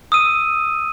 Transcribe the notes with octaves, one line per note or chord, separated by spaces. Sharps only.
D#6 E6 D#7